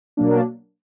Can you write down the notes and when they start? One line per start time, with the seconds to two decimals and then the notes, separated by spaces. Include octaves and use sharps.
0.17 B2 F#3 A#3 D4